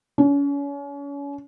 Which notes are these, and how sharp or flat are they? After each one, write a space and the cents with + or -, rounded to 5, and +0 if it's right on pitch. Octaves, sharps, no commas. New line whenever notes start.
C#4 +35